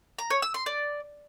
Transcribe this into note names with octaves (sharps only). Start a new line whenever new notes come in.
A#5
C#5
E6
C6
D5